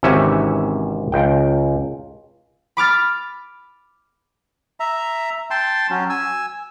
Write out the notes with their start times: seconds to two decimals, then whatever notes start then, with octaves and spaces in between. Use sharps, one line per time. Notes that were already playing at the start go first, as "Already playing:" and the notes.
0.03 G#1 C3 E3 C#4 E5
1.12 C#2 G5
2.77 B5 D6 F6 A6
4.80 E5 A#5
5.51 G5 A5 C6
5.90 F#3 C#4
6.10 G#5 E6